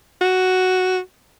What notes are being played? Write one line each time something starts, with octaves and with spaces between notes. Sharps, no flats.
F#4